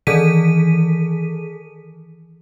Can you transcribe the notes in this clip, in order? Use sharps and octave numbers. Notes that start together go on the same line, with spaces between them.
D#3 E3 G#4 A4 B6 D#7